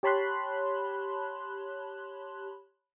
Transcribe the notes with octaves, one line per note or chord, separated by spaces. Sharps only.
G4 C#5 A5 B5 C6 F#6